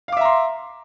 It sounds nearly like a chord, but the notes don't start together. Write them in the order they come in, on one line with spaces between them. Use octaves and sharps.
F5 D6 E5 A#5 C6